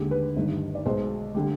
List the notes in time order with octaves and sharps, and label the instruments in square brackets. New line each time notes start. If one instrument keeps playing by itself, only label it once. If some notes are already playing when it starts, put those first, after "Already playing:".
Already playing: [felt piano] D#2 D3 G#3 G4
B4
G1 G2 D#3
D5
B1 B2 G#3 C5
D3 G3